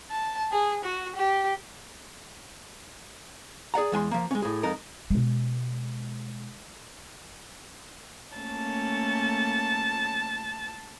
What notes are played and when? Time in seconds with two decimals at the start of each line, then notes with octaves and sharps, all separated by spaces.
0.11 A5
0.52 G#4
0.84 F#4
1.16 G4
3.74 G#4 D5 F#5 A#5
3.92 E2 G#3 G#5 C6
4.11 F3 A#3
4.31 G#3 C#4
4.42 A2 G#4
4.63 F2 G#3 D#4 A4 A#4
5.10 B2 G#3
8.37 A3 A#3 C#4 A5